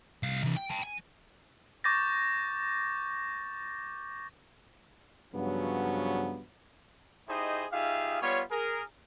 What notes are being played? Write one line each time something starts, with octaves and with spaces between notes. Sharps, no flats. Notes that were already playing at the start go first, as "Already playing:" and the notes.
C2 F5
C3 E3
G5
G5 A5
G#5
C#6 D6 G6 A6 A#6
G2 C#3 F3 F#3 B3
D#4 E4 G4 G#4 C5 D#5
D#4 F4 G4 G#4 E5 F5
G3 B3 F4 C#5
G#4 A#4